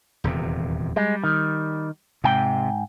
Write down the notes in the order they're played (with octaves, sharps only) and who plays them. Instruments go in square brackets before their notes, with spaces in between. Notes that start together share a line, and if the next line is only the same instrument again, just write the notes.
[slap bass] D#1 E2 C3
[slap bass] G3 [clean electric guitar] G#3
[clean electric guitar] D#3
[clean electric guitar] G#2 G5 [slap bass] C3